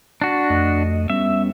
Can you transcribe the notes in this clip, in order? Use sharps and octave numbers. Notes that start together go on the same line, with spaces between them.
D4 F#4
F2 A3 D#5
G3 B3 C#4 E5